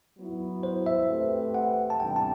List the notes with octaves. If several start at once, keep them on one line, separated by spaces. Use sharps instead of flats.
F#3 B3 E4
C5
E5
A3 C4 G4 B4
F#5
A5
C3 E3 G3 B3 D4 G5
A5